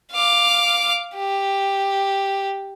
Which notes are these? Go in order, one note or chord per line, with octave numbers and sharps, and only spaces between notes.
F5 D6
G4